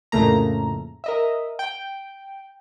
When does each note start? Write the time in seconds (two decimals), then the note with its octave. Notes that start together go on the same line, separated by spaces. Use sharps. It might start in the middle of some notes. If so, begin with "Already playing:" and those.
0.12 F2 A2 C#3 A3 A#3 A#5
1.04 A#4 D#5 E5
1.59 G5